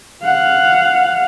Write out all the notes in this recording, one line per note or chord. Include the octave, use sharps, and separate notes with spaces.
F5 F#5